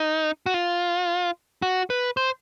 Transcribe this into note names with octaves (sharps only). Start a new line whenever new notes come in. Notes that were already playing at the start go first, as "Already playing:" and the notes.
Already playing: D#4
F#4
F4
F#4
B4
C5